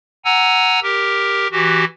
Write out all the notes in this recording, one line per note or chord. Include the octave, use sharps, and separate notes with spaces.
F#5 G#5 A#5 E6
G4 A#4
E3 F#4 G4